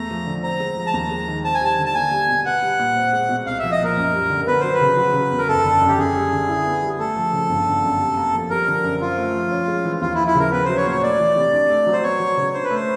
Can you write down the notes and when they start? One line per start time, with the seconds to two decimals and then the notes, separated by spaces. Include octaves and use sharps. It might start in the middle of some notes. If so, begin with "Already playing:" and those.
Already playing: E2 A3 A#5
0.11 F3
0.27 D3
0.43 C4 A#5
0.60 G#3
0.77 F3
0.87 A5
0.94 D#2 A#5
1.11 G#3
1.28 D#3
1.44 C4 A5
1.55 G#5
1.61 G3 A5
1.78 D3
1.86 A5
1.95 A#3 G#5
2.11 G3
2.28 B2
2.45 B3 F#5
2.62 G3
2.80 A#2
2.96 C4
3.13 G#3
3.29 B2
3.46 C2 F5
3.59 F3 E5
3.72 D#5
3.80 A#2 A#4
3.96 F#2
4.13 G3
4.30 D3
4.47 B3 B4
4.60 F#3 C5
4.74 B4
4.81 C#3
4.97 F#3
5.14 C#3
5.31 E2
5.38 A#4
5.48 F#1 A4
5.64 D3
5.81 F#2
5.88 G4
5.98 F#2 G#4
6.15 G3
6.33 D3
6.49 E4
6.66 B3
6.83 G3
6.99 A3 A4
7.16 F3
7.33 C#3
7.49 G1
7.67 D3
7.84 F#2
7.99 C3
8.17 A#3
8.34 F3
8.50 G3 A#4
8.68 D3
8.83 F#2
9.01 C4 F4
9.18 A3
9.34 F3
9.52 C#4
9.68 G#3
9.85 E3
10.01 D#2 F4
10.14 E4
10.19 F3
10.27 E4
10.35 C#3 A#4
10.52 B3 B4
10.65 F#3 C5
10.77 C#5
10.86 A#2 C5
10.90 C#5
11.02 A3 D5
11.20 E3
11.36 C3
11.53 D4
11.70 A3
11.87 F#3
11.93 C5
12.03 B3 C#5
12.20 F#3
12.37 C#3
12.54 D4 C5
12.64 B4
12.70 A3 C5